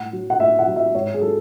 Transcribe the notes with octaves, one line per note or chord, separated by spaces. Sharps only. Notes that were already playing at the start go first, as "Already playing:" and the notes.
Already playing: A2 F#5
F#3
F#5
A2 E5
F#5
F#3
E5
G#2 C#5
G#4
F#3 A4